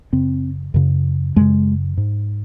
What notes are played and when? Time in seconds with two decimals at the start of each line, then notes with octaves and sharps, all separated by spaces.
0.13 F#2 C#3 C4
0.74 F#2 C#3
1.36 F#2 C#3 G#3
1.97 G#2